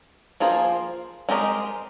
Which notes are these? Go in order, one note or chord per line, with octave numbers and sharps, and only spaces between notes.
F3 A#3 F4 G#4 C5
G#3 C4 G4 A#4 D#5